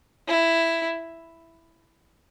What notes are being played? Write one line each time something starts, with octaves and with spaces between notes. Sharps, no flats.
E4